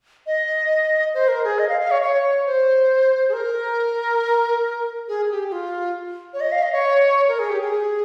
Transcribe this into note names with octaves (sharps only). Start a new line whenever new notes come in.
D#5
C5
A#4
G#4
D#5
F5
F5
C#5
C#5
C5
G#4
A#4
G#4
G#4
G4
G4
F4
C#5
D#5
F5
D#5
C#5
A#4
G#4
G4
G#4